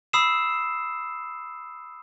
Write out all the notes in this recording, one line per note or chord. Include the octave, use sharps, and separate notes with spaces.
B5 D#6 E6 C7 E7